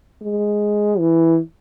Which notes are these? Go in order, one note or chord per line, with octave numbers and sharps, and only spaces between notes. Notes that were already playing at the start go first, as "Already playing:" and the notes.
G#3
E3